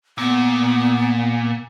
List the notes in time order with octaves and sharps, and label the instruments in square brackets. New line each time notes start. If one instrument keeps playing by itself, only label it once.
[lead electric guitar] A#2 [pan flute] B3